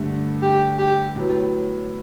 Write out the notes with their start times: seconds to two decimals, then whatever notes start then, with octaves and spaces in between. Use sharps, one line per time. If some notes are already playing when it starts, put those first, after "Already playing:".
Already playing: G2 D3 A3
0.42 G4
0.79 G4
1.16 A2 F#3 B3